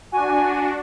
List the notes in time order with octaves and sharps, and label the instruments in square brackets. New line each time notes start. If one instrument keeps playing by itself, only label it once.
[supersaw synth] D4 F#4 [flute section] G#5